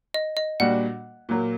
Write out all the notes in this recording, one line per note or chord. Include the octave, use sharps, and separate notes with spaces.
D#5
D#5
A#2 G3 D4 F#4 F#5
A#2 F#3 A#3